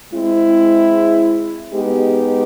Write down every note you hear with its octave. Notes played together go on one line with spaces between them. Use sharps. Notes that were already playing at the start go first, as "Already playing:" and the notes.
G#3 C4 E4
G#3 B3 D#4 G4